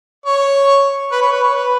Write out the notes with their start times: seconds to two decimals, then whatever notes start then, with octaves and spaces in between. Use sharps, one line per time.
0.26 C#5
1.12 B4
1.22 C#5
1.33 B4
1.43 C#5
1.55 B4